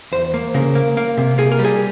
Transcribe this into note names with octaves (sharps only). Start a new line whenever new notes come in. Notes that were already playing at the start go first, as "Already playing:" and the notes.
E2 C5
A#3
C#3 A#4
A#3
A#3
C3
A#3 G#4
A#4
G3
G#4